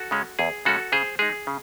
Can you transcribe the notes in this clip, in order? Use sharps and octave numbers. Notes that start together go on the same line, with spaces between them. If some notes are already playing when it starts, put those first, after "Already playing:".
Already playing: F#4 A4
C#3 G#3 C#4
E2 G#4
C#3 G#3 C#4 F#4 A4
C#3 G#4 C5
G#3 D#4 G#4
C#3